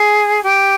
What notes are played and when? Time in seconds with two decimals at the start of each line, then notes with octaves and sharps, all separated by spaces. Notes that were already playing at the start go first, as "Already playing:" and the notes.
Already playing: G#4
0.43 G4